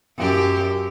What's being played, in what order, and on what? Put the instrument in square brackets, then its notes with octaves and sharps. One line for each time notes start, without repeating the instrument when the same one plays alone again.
[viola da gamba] F#2 G4